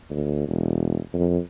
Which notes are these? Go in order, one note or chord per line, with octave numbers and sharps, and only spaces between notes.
D2
E1
F2